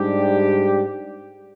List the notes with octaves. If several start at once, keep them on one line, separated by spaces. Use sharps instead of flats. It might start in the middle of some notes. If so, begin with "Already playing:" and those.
Already playing: G#2 G3 D4 G4